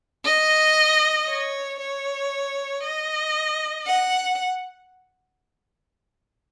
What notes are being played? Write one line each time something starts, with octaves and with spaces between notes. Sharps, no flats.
D#5
C#5
C#5
D#5
F#5